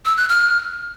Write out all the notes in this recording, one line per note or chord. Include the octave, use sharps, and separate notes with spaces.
E6
F#6
F6